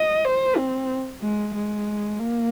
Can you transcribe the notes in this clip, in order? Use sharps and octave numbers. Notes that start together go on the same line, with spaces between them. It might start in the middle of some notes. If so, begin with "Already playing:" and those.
Already playing: D#5
C5
C4
G#3
G#3
A#3